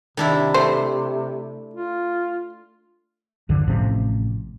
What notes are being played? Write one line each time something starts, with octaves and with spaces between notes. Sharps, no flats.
C3 D#3 D4 E4
A3 C5
F4
C2 G2 D3 F3
A1 A2 C3 F3